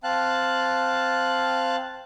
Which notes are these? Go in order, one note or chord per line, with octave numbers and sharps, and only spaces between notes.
C4 F5 A5 F#6